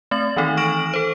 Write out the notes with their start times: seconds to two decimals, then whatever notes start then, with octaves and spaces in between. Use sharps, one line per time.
0.11 A3 C4 A6 F#7
0.37 D#3 E3 C4 D#4 A4
0.57 C#6 F6 A#6 D7 E7 F#7
0.91 A4 C5 D7